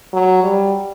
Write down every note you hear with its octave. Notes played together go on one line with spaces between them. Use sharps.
F#3
G3